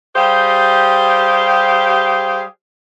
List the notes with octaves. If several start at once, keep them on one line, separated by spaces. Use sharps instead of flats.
G3 G4 G#4 C5 F5